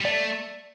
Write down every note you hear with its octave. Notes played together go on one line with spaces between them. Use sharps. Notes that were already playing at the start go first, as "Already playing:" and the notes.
G3
A3 D5